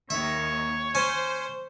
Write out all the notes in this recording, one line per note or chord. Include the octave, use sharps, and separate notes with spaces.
D#2 D#3 C#5 E5
C#4 C5